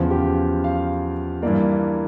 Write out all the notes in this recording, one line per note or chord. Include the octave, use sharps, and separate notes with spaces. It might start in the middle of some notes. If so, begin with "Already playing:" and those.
Already playing: E2 C#3 F3
G4
F5
G2 E3 A#3 D5